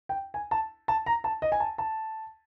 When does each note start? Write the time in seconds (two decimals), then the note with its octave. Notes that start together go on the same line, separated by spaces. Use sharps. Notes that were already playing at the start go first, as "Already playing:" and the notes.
0.09 G5
0.34 G#5
0.51 A5
0.88 A5
1.06 A#5
1.24 A5
1.42 D#5
1.52 G#5
1.60 A5
1.78 A5